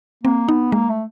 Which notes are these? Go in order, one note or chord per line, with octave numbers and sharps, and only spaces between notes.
A#3 C4
B3 D#4
G#3 A#3
A3